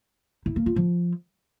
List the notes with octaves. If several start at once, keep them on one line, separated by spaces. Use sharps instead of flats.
E4
A#3
F4
F3